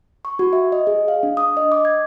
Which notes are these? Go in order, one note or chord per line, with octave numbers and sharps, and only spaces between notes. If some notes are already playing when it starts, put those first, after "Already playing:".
C#6
F#4
E5
D#5
G#4
F5
D4
D#6
D#5
D6
G#6